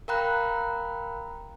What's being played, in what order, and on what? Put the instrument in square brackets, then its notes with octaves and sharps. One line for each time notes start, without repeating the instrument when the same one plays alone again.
[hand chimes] A#4 F5 G5 A#5 B5 F#6